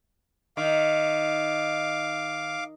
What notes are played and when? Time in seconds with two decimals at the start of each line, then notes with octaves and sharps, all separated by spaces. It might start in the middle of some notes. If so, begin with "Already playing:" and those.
0.57 D#3 F5 D6